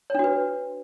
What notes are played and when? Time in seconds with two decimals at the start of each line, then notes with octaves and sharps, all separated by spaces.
0.10 C#5
0.14 D4
0.19 F#4
0.24 B4